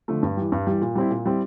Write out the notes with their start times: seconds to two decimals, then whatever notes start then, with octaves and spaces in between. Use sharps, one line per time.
0.08 D3 F3 A3
0.23 G2
0.37 E3 G3
0.52 G2
0.67 E3 G3
0.81 A#2
0.95 G3 C4 E4
1.11 A#2
1.26 G3 C4 E4